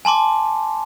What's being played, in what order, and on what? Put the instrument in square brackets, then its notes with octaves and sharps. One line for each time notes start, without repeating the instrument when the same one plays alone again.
[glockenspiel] G#5 A5 C6 D6